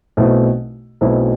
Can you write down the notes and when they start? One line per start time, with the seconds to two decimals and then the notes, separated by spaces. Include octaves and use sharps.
0.17 B1 B2 A3 C4 E4
1.01 B1 B2 A3 C4 E4